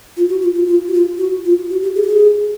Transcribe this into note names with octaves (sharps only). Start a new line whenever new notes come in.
F4
F#4
F4
F4
F4
F#4
F4
F#4
F4
F#4
G4
G#4
G4
G#4